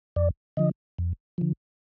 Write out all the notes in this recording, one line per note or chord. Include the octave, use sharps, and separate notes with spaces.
F2 D5
D3 F3 D#5
F2
D3 F3